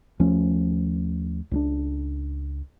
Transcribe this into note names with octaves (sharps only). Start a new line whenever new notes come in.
D#2 F3 A3 C#4
C#2 G3 D4